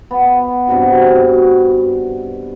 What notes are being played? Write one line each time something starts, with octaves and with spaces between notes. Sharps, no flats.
B3
G2 C3 F#4
B2